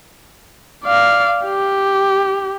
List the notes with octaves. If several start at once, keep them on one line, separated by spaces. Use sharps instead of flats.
D5 F5
G4